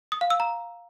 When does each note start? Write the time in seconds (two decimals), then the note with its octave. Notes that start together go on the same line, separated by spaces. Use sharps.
0.12 D#6
0.21 F5
0.30 E6
0.40 A#5